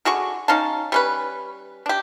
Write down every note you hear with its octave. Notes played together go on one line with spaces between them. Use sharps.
D3 F#4 G#4 C#6
C#4 D#4 F5 A5
G3 C#4 B4
D4 G4